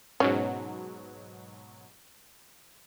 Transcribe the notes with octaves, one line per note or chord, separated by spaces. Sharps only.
G#2 B2 F#3 C#4